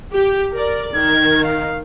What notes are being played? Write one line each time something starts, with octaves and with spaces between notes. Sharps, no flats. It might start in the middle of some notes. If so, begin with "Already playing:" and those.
G4
A#4 D5
D#3 G#6
F5